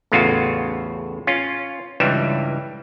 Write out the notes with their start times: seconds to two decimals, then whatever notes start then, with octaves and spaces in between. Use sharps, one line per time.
0.12 A1 E2 A2 C#3 F4 F#4
1.27 C#4 F4
2.00 C#2 G2 E3 G3 E5